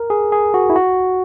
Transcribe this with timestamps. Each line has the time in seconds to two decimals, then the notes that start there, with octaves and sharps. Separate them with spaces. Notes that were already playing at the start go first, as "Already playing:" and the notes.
Already playing: A#4
0.10 G#4
0.32 G#4
0.54 F#4
0.70 E4
0.76 F#4